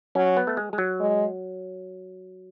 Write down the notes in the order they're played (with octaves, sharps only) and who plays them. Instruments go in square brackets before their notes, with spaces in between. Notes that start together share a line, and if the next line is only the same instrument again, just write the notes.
[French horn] F#3 [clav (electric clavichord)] C#4
[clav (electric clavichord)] B3
A3
G#3
G#3
F#3
[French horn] G#3